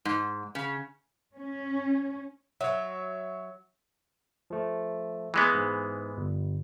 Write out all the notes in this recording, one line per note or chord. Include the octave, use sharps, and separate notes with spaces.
G#2
C#3
C#4
F#3 C#5 E5
F3 A3
E3 G#3 B3
G#2
G1